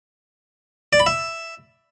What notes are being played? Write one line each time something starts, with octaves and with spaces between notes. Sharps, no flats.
D5
B5
E5